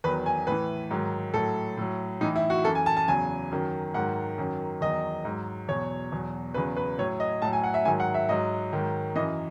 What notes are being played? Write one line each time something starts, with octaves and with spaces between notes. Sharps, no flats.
E2 D#3 F#3 B4
G#5
A2 E3 B4
G#2 D#3 F#3
A2 F#3 A4
A2 F#3
A2 E3 D#4
E4
F#4
F#2 E3 A4
G#5
A5
A5
E2 C#3 F#3 G#5
F#2 D#3 F#3
G#2 D#3 F#3 F#5
F#2 D#3 F#3
E2 D#3 F#3 D#5
G#2 F#3
E2 B2 F#3 C#5
E2 B2 F#3
E2 C#3 F#3 B4
B4
A2 F#3 C#5
D#5
A2 F#3 A5
G#5
F#5
E5
G#2 D#3 F#3 G#5
F#5
E5
G#2 F#3 D#5
G#2 D#3 F#3
F#2 E3 D#5